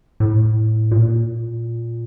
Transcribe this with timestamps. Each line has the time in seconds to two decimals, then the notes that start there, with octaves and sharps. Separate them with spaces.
0.20 A2
0.91 A#2